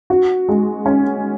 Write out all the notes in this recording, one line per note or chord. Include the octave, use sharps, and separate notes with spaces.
F#4
G#3
C#4